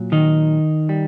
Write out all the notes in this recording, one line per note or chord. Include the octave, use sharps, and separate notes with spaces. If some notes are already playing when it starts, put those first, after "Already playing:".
Already playing: A#2 F#3
D#3 D#4
G3